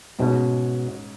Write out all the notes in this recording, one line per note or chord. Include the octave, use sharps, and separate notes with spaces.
G#2 B2 G#3 C#4